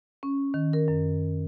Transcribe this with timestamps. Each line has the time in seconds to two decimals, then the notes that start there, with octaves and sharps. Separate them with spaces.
0.23 C#4
0.54 D#3
0.73 A#4
0.88 F#2